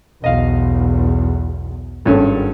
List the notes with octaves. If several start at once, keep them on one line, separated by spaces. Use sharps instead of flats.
B1 E2 D#5 F5
G#1 G2 C#4 A4